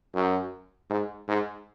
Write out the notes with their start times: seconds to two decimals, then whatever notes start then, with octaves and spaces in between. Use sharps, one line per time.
0.15 F#2
0.90 G#2
1.28 G#2